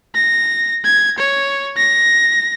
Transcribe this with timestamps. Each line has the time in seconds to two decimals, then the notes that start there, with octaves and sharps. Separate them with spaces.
0.15 A#6
0.85 G#6
1.18 C#5
1.77 A#6